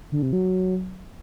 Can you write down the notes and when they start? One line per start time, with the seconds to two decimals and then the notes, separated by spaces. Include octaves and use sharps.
0.12 D3
0.22 C3
0.33 F#3